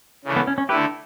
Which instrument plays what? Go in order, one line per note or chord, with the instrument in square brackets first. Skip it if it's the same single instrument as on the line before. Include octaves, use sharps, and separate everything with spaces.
[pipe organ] C#3 E3 A3 D4
[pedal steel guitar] B3
C#4
C#4
[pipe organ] D3 A3 E4 [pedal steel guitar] G4 B4